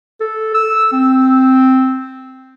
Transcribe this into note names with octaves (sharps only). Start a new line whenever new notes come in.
A4
E6
C4